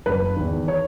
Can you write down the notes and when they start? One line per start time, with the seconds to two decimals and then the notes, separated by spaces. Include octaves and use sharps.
0.06 F#1 B4
0.37 E2 D#3
0.68 C#5